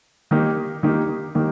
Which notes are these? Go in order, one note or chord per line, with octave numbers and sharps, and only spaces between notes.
D#3 A#3 D#4 G4
D#3 A#3 D#4 G4
D#3 A#3 D#4 G4